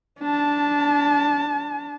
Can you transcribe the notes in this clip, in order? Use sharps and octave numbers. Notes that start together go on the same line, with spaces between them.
D4 A5